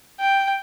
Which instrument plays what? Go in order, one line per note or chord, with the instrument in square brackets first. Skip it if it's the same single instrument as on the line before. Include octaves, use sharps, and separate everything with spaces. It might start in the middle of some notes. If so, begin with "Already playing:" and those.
[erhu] G5